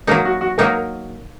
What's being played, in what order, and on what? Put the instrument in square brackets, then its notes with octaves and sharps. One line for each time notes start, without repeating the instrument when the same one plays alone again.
[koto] F#3 A#3 D#4 [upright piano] A#4
[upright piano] F#4
F#4
[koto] F#3 A#3 D#4 [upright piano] A#4